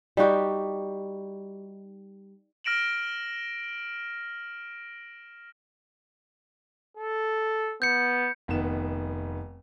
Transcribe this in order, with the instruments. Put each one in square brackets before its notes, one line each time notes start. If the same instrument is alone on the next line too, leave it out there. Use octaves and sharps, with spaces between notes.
[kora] G3 D#4 F#4 G4
[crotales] F6 A#6 D7 E7 F#7
[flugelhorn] A4
[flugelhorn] B3 [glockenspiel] G6 C#7
[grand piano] F1 D#3 B3 E7